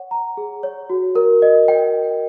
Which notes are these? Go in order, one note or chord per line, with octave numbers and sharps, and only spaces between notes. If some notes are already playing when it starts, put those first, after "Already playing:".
Already playing: C#5 F#5
A#5
G#4
C#5
F#4
A#4
D#5
G5